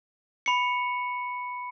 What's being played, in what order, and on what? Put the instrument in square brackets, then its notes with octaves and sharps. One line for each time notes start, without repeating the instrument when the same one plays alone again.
[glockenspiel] B5 C#7